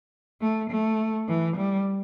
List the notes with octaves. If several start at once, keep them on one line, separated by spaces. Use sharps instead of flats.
A3
A3
E3
G3